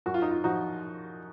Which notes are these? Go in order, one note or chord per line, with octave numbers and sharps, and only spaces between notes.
F#2 F#4
F4
D#4
F4
F3 D#4 F#4